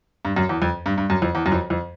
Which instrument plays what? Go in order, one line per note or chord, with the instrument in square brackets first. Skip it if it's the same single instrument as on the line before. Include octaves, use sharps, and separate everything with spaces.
[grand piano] G2
F#2
E2
F2
G2
G2
F#2
F2
E2
F#2
F2
F2